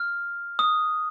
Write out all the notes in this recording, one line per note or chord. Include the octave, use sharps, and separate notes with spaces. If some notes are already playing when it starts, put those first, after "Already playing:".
Already playing: F6
D#6